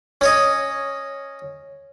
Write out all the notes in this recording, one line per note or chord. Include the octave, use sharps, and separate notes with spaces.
C#4 C#5 D#5